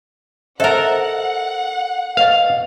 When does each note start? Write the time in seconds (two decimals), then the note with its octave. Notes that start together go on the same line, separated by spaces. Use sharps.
0.60 A4 A#4 C5 D#5 E5 F#5
2.17 B4 D#5 F5